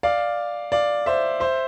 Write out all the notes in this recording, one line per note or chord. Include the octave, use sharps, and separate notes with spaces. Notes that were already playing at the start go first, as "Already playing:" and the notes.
D5 F5
D5 F5
C5 E5
C5 E5